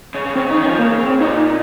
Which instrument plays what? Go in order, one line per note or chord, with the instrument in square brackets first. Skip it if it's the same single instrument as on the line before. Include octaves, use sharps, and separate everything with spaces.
[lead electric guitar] C#3
C#3
[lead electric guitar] C#3 [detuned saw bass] C4
[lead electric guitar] C#3 [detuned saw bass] D#4
[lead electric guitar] D#3
[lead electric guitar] F3 [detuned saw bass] C#4
[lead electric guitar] C#3 [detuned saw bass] A#3
[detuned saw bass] C4
[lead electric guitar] A#2 [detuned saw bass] D#4